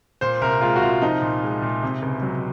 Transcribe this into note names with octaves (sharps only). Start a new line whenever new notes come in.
A#2 C5
C2 A#4
G#3 F4
F#4
C2 F4
F3 D#4
A#2
G#3
A#2
C3
C#2
F#3